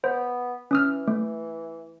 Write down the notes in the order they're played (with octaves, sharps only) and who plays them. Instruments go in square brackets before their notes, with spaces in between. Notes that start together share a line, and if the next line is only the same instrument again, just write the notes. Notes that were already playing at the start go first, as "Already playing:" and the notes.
[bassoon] B3 [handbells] C5
[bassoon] E3 [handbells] C#4 D#6 F6
[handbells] A3